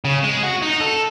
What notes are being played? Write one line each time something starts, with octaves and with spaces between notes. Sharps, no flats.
C#3
G#3
F#4
D#4
A4